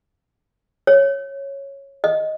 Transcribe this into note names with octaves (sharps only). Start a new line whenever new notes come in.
C#5
D#5